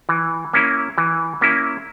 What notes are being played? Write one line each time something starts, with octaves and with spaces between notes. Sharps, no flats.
E3
A#3 C#4 E4
E3
A#3 C#4 E4